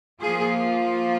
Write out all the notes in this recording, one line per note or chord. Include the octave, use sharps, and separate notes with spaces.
F3 A#3 F4 G#4